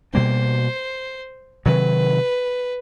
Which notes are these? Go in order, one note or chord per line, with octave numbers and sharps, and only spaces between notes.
B2 G3 A#3 D4 C5
C3 D#3 F#3 B4